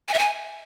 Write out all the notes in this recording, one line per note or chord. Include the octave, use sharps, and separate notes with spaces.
G#5
E5
G#5